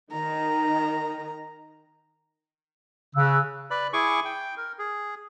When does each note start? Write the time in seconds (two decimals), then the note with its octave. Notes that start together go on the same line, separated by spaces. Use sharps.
0.12 D#3 A#5
3.15 C#3 E6 F#6
3.71 B4 D5 B5
3.93 E4 G#4 G#5 C#6 D6
4.25 G5
4.57 A#4
4.79 G#4